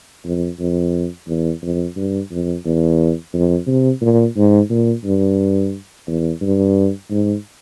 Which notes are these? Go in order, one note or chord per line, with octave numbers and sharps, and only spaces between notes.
F2
F2
E2
F2
G2
F2
E2
F2
C3
A#2
G#2
A#2
G2
E2
G2
G#2